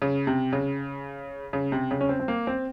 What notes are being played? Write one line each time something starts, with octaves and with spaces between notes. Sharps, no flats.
C#3
C3
C#3
C#3
C3
C#3
C#4
C4
C4
A#3
C4